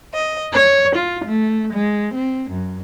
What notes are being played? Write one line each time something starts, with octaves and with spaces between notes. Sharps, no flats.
D#5
C#5
F4
A3
G#3
C4
F#2